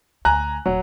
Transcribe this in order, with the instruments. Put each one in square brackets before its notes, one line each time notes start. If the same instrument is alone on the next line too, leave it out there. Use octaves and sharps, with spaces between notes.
[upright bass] D2 [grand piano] G#5 A#5 F#6
[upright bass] D#1 [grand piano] F#3